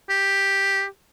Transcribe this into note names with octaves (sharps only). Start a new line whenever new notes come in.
G4